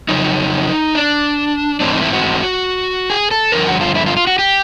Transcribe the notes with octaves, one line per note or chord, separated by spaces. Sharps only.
F2 C#3 F#3 D#4
D4
G#2 E3 A3 C4 D4
D#4
E4
F#4
G#4
A4
G2 D3 F3 A#4
F#4
F4
E4
F4
F4
F#4
G4